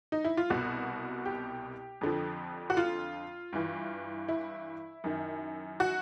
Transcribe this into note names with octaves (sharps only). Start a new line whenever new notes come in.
D#4
E4
F4
C2 B2 F#4
G4
F2 D3 F3
F#4
F4
G2 E3
E4
F#2 D#3
F#4